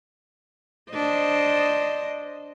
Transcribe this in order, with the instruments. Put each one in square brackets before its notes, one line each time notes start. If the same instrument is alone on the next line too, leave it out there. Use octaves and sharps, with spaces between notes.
[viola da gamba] D4 C5 D#5